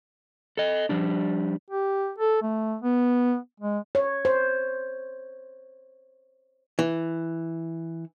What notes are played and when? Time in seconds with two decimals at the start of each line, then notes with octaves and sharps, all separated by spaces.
0.57 A4 D#5
0.89 F3 G3 D4
1.71 G4
2.19 A4
2.42 A3
2.82 B3
3.60 G#3
3.95 C#5
4.25 C5
6.79 E3